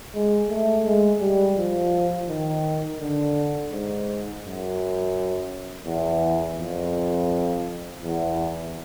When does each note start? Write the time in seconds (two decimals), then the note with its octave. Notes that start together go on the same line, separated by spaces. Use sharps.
0.15 G#3
0.49 A3
0.86 G#3
1.21 G3
1.57 F3
2.29 D#3
3.00 D3
3.72 G#2
4.44 F#2
5.86 E2
6.58 F2
8.01 E2